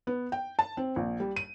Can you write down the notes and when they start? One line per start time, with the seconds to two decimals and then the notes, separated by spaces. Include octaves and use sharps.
0.07 B3
0.32 G5
0.59 A5
0.77 C4
0.96 A#1
1.20 G3
1.36 D#7